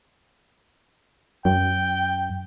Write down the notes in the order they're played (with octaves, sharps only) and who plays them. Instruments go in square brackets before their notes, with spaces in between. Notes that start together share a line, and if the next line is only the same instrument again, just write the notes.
[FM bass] F#2 [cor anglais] G5